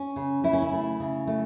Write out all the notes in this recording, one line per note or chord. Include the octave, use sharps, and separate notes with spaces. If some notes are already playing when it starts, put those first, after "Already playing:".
Already playing: C#4
C#3
C#3 E4
C#4
E4
A3
C#3
A3